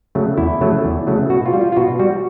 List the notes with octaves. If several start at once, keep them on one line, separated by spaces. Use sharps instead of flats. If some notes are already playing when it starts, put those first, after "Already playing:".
C#3 F#3 A3
E2 E4
C#3 F#3 A3
E2
C#3 F#3 A3
B2 F#4
F4
G3
F4
F4
B2 F#4
G3 F#4